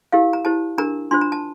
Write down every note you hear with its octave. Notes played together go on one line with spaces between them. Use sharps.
E4 G4 A#4 F5
A#5
E4 G4 C5 A5
D4 G4 A#4 A#5
D4 F4 C5 C6
A#5
A5